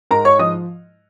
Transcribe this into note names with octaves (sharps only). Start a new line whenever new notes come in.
G#2 A#4 A#5
C#5 C#6
F3 D#5 D#6